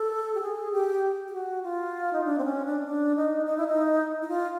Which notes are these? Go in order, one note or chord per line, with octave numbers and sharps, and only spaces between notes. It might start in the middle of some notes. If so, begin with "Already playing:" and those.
Already playing: A4
G4
G#4
G4
G4
F#4
F4
D#4
D4
C4
C#4
D4
D#4
D4
D#4
D#4
E4
D#4
E4
F4